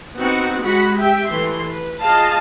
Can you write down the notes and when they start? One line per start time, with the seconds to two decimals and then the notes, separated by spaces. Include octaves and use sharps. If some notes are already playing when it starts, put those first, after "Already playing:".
0.16 B3 C4 D#4 F#4 F#5
0.63 G#3 F#4 F#5 B5
0.96 G4 E5 G5
1.27 E3 A3 C6
1.70 B4
2.01 F4 G#4 D#5 F5 A5